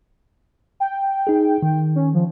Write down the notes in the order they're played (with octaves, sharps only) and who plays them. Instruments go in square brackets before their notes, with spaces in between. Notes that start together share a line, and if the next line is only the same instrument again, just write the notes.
[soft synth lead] G5
[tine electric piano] D#4 G#4
D#3
[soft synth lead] C#4
F3